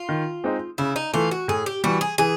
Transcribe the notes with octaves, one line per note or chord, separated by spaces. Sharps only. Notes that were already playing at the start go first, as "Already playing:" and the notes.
Already playing: F4
D#3
G#3 C4 D#4
C#3 E4
D#4
E3 A3 F4
F#4
A2 G#4
G4
E3 G3 F#4
G#4
E3 G#4